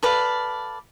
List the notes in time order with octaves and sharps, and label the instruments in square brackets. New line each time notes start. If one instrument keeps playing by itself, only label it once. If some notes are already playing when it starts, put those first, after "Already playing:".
[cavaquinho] A4 B4 D5 F5